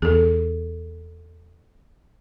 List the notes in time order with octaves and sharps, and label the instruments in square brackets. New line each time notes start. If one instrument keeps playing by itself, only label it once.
[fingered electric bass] E2 [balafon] G#4 A4